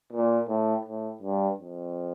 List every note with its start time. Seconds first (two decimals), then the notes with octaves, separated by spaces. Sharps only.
0.13 A#2
0.49 A2
0.86 A2
1.23 G2
1.60 F2